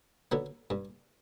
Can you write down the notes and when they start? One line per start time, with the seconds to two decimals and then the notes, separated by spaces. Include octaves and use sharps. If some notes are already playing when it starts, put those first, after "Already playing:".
0.32 D3 F#3 B3
0.70 G2